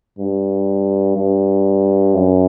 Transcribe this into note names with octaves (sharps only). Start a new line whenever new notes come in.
G2
G2
F#2